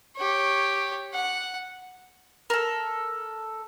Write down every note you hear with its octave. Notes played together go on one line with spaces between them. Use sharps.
G4 C#5
F#5
A4 A#4